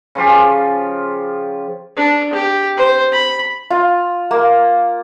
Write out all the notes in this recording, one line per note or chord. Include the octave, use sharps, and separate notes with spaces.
C#3 F3 F4 G4
D4
G4
C5
B5
F4
A#3